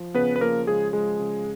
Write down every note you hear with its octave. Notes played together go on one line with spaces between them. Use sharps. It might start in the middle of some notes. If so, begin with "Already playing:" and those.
Already playing: F3
C#3 B3 B4
B4
F3 A#3 A#4
C#3 G#3 G#4
F3 G#3 G#4
C#3